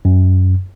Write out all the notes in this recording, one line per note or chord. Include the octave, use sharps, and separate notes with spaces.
F#2